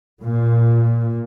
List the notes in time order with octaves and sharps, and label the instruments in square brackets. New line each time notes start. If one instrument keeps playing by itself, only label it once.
[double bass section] A#2